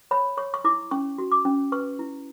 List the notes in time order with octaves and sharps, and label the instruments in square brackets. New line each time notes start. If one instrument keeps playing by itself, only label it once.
[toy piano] C#5 B5
C#5 C#6
C#6
E4 D6
C#4 C#6
F#4
D6
C#4
B4 C#6
E4